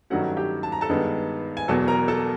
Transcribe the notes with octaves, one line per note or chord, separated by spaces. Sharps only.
G2 D#3 F#3 A3 C#4 F#4 F#5
G4 G5
A5
A#5
A4 A5
G2 D#3 G#3 B3
G#5
E1 E2 B2 F#3 A4 A5
A#4 A#5
A4 A5